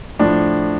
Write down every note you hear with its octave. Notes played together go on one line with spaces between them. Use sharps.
A2 F3 D4